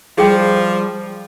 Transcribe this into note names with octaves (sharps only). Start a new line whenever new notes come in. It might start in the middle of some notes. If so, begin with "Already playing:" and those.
F3 G3 G#4 G5